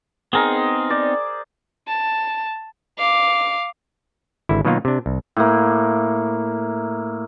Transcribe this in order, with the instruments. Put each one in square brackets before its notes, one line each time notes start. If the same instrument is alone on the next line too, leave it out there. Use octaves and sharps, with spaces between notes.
[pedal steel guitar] B3 C4 D#4 [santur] G#4 A#4
[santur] C5 D5
[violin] A5
F5 D6
[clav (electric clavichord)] G#1 D3 E4
B2 D#3 F#3 A#3 D#4 F4
C3 D4
C2
[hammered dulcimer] A2 A#3